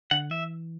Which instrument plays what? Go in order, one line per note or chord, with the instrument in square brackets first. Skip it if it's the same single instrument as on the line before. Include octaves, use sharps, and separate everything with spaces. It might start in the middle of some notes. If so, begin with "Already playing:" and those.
[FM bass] D3 [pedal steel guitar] F#5
[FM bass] E3 [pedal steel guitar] E5